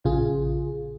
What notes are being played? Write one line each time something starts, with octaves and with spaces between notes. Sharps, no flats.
A#1 C#3 F4 G#4